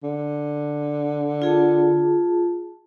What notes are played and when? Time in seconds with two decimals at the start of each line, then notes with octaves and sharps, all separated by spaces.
0.03 D3
1.42 F4 G#4 A5